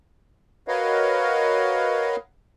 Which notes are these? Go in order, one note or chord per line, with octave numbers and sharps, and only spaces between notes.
F#4 A#4 B4 C#5 D#5 F5